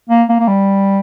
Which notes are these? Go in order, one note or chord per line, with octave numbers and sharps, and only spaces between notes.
A#3
A#3
A#3
G3